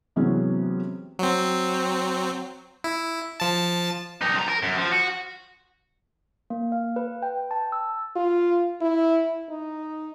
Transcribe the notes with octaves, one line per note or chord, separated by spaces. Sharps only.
C3 E3 F#3 G#3 B3 C#4
F#3 C4
E4
F3 A5
G2 D#4
F3 A#5
A#4
F#2
F3
F#4
A#3
F5
B4
G5
A5
E6
F4
E4
D#4